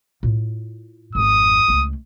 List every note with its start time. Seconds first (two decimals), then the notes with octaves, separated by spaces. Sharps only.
0.23 A2 F4
1.15 G#1 F2 D#6
1.68 C#2 A3